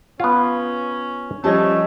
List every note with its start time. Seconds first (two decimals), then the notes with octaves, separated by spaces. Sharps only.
0.20 B3 C#4 F4
1.44 F3 G3 A3 C#4 C#5 D#5 A5